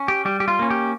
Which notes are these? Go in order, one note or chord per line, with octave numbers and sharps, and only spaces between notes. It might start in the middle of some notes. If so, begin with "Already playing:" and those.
Already playing: C#4
G4
G3 G4
G4
F4
A#3 C#4
G4